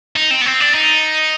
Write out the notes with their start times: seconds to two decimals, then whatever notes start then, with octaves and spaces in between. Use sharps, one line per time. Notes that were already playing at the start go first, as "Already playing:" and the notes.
0.16 D#4
0.30 C4
0.41 B3
0.46 C4
0.60 D4
0.74 D#4